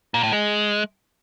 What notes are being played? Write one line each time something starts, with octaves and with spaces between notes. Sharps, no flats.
A#2
A2
G#3